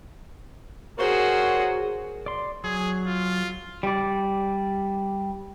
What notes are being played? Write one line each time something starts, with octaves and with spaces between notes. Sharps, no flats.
F#4 G#4 A#4 C5 C#5
D5 C6
F#3 G#4
F4
G3 D5